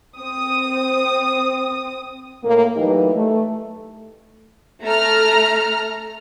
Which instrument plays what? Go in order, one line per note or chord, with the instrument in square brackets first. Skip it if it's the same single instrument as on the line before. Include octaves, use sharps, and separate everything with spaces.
[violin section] C4 D#6
[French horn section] A2 A#3
E3 F#3 A3 D#4 G4 B4
A3
[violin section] A3 A#5 F6